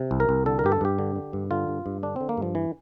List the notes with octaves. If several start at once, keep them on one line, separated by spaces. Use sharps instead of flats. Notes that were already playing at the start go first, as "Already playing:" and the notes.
Already playing: C3
C2
A#4
C2
D3 A4
A#4
G2 G4
A4
G2 G4
D3
D3
G2
D3 F4
G2
G2
D3 D4
D3 C4
A#3
G2 F3
E3